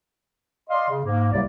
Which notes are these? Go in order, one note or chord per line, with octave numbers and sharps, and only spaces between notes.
D5 D#5 F5 C6
C#3
G#2 A#3
C2 C3 F#3 G3 A#3 D5